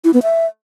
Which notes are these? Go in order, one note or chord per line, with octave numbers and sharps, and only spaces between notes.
E4
B3
E5